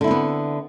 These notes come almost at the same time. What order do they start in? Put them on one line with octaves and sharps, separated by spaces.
D3 E4 C4 B3